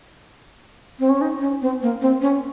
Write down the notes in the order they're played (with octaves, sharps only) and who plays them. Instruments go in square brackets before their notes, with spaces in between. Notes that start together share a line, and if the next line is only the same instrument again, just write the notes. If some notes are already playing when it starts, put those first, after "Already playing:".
[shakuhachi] C4
C#4
D#4
C#4
C4
A#3
C4
C#4